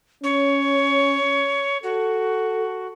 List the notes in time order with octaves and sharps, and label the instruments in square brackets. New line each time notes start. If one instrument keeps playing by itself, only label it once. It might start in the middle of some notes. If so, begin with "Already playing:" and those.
[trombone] C#4 [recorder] C#5
[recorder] F#4 [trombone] A4